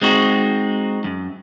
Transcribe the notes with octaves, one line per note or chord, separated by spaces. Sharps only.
G#3 C4 D#4 F#4
F#2